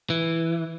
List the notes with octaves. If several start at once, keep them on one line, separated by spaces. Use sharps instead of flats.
E3